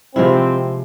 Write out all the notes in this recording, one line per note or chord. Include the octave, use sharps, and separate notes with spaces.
C3 F3 G#3 C4 E4